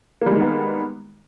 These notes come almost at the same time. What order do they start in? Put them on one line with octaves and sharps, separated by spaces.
A#3 G3 G#3 D#3 B3